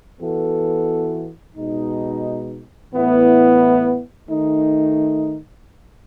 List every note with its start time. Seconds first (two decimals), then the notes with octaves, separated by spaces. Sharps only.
0.21 E3 B3 F#4 A4
1.57 B2 G#3 D#4
2.93 A2 E3 B3 E4
4.29 D#3 A3 D#4